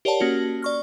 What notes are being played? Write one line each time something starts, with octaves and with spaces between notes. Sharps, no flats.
G4 A#4 C#5 D5 F#5 A5
A#3 C#4 F#4
D5 C#6 F6